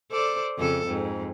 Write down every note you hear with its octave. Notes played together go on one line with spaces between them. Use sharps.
A4 C5 D5
F2 C#3 A4
F2 G#2